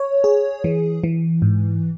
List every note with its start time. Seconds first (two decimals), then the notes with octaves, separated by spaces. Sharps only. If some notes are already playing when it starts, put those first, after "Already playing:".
Already playing: C#5
0.24 G#4
0.64 E3
1.04 E3
1.42 G#2